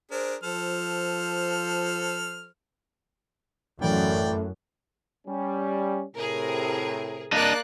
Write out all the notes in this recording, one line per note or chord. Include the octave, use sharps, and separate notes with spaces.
D4 G#4 A#4 C5
F3 A4 C5 F6
A1 F#2 A3 D5 G5
G3 C#4
A2 C3 G#4 A#4
A#3 D4 D5 D#5 F#6